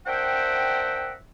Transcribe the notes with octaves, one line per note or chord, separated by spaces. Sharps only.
D4 A#4 C5 E5 F#5 G5